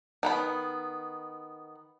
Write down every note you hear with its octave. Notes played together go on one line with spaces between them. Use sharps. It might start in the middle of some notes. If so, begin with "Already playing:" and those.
D#3 B3 B5